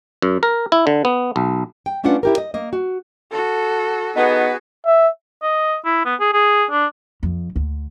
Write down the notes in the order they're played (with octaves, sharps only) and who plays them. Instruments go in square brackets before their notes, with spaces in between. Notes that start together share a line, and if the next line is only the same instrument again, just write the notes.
[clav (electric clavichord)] F#2
A#4
E4
D3
B3
B1
[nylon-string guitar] G5
A3 C#4 D4 F4 B4 F#5
E4 G4 A#4
D#5
A#3 D#5
F#4
[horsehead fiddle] F#4 [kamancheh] A4
[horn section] B3 [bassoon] D#4 [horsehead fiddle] F#4 G#4
[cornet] E5
[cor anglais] D#5
E4
B3
G#4
G#4
D4
[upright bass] F2
D2